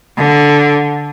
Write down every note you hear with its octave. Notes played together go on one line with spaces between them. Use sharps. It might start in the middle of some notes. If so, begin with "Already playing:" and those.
D3